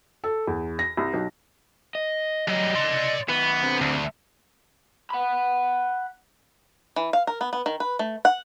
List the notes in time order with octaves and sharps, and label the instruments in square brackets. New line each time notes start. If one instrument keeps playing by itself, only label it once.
[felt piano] A4
E2
A#6
C2
B1
[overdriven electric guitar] D#5
[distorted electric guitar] F#3 G3 [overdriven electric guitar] D#5
[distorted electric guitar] D5 C6
[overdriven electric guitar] D#3 B4 [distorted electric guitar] B3
[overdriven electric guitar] D3 C4
[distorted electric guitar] D2
[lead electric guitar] F#5 B5
[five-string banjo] E3
F5
A#4
B3
B3
D#3
B4
A3
F#5